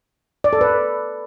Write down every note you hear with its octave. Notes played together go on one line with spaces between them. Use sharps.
D5
A4
B4